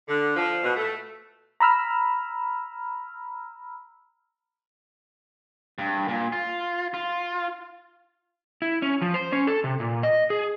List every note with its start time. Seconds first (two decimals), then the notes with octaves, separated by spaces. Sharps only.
0.07 D3
0.35 F3
0.62 B2
0.76 A3
1.60 A#5 B5 E6 F6
5.78 G2
6.08 A#2
6.32 F4
6.94 F4
8.62 E4
8.82 C#4
9.02 F3
9.14 C5
9.32 C#4
9.47 A4
9.64 C3
9.80 A#2
10.03 D#5
10.30 G#4